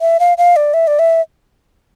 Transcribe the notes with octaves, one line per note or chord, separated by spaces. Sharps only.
E5
F5
F5
D5
E5
D5
E5